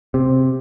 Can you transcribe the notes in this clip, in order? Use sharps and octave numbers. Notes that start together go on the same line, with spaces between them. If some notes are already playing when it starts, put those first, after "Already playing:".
C3